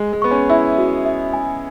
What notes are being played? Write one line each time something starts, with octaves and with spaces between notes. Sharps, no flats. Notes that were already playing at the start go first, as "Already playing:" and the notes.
Already playing: G#3
G#3
B3 C#6
C#4
E4 E5
F#4
E5
G#5